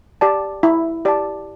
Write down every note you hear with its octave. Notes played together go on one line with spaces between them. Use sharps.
G4 D5 A5
E4
G4 D5 A5